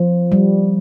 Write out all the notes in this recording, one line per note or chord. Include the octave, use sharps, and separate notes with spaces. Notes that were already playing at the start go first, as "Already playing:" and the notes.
Already playing: F3
G3